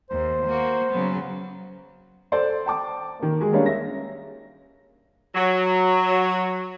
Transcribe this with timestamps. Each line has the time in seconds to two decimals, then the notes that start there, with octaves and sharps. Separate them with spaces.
0.10 D#2 C5
0.45 A#3 F#4
0.90 C#3 F#3 B3
2.32 A4 C5 D5
2.66 G5 A5 D6
3.19 D#3 A#3
3.41 G#3 F#4 G#4
3.52 G3 A#3 C#4 D4 C#5 F5
3.66 E5 A#6
5.35 F#3